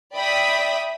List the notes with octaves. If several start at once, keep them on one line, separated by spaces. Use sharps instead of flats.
D5 E5 G5 B5 D#6 B6